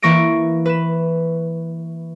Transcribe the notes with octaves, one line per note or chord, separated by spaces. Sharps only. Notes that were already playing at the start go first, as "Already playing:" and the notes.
E3 A#3 C#6 A#6 D7
B4 E7